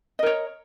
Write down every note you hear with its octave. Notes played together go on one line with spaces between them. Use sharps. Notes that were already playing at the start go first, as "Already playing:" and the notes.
A#4 C#5 D#5